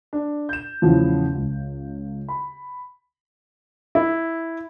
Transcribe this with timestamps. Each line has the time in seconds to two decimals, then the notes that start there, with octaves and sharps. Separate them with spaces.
0.13 D4
0.49 G6 E7
0.82 E2 A2 C#3 E3 F3
1.36 C#2
2.28 B5
3.95 E4